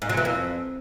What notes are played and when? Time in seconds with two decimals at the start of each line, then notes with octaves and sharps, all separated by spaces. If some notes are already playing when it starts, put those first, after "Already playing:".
0.02 G#2
0.09 F#3
0.17 E3
0.25 F2